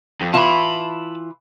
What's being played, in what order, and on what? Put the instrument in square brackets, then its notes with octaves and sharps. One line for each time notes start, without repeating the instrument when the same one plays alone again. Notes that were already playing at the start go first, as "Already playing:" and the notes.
[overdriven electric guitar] F2
[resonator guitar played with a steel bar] E3 E4 F4 [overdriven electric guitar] A5 B5